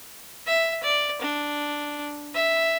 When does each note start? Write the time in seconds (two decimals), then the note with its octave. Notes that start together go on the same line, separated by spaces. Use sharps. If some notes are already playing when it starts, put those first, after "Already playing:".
0.47 E5
0.83 D5
1.22 D4
2.35 E5